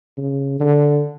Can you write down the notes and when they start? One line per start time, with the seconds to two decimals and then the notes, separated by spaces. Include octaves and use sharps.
0.18 C#3
0.60 D3